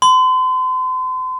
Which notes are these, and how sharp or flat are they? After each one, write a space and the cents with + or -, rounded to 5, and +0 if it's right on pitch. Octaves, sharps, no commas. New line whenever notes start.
C6 -40